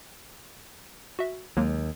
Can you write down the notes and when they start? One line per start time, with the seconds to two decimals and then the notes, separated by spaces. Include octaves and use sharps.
1.19 F#4 E5
1.57 D#2 F#3 G#3 A#3